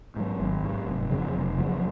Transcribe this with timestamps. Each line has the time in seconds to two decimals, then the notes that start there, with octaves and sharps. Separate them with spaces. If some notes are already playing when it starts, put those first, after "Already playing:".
0.16 G#2 F#3
0.40 G#1
0.63 G#2 F#3
0.87 F1
1.11 F2 C#3 F#3
1.34 F1
1.58 F2 C#3 F#3